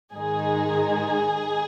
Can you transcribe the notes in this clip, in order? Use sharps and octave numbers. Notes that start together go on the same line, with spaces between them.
G#2 D#3 G#3 D#4 G#4